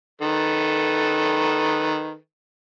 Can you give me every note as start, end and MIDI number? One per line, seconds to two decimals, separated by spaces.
0.21 2.17 51
0.21 2.17 69
0.21 2.17 71